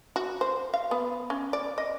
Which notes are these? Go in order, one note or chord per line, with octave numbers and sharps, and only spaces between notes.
F#4
C5
F5
B3
C#4
D5
D#5